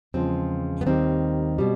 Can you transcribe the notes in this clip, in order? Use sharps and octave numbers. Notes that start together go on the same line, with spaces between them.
E2 C#3 F3 G#3 C4
B3
D#2 D#3 G3 C4
B2 G3